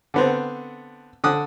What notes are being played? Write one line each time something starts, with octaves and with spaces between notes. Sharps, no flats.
D3 B3 C4
D3 D#6 F#6